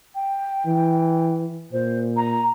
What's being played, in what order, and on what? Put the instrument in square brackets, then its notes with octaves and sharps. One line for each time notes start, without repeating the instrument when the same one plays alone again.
[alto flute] G5
[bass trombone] E3
[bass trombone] A#2 [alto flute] C5
[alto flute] A#5